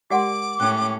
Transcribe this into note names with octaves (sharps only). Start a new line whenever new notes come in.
G#3 G4 A#4 D5 F#5 C6 D6
A2 C#4 G5 F#6